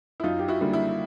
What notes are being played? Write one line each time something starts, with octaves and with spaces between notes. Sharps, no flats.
E4
F#2 D#4 F4
G4
E4 F#4
D3 G3 A#3
E4